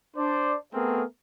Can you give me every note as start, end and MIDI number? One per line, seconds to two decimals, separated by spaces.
0.17 0.56 62
0.17 0.56 72
0.17 0.56 74
0.74 1.03 57
0.74 1.03 59
0.74 1.03 60
0.74 1.03 68
0.74 1.03 70